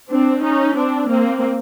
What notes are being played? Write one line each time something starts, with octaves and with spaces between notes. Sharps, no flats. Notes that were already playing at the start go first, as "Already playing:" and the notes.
C4 D4
C#4 D#4
C4 D4
A#3 C4